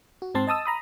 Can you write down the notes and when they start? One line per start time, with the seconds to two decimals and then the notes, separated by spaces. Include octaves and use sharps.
0.22 F#4
0.35 G#2 C4 A5 C6
0.47 D#5 A5 D#6 E6
0.66 A#5 B5 D#6